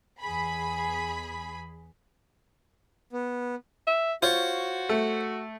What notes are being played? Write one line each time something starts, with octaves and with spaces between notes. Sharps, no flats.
E2 G#4 B5
B3
E5
F4 F#4 C5 C#5
A3